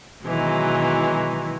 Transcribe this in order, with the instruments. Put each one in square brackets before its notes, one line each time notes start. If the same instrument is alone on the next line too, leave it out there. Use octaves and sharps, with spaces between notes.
[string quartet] B2 D#3 E3 F#3 G#3